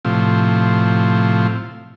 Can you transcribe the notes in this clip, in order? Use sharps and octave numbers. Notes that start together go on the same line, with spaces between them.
A2 C3 F3